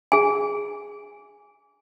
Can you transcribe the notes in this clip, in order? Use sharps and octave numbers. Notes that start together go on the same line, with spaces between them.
G#4 G#5